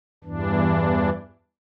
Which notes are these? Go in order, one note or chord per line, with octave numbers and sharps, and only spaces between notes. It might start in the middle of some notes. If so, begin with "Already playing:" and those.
E2 G2 E3 D4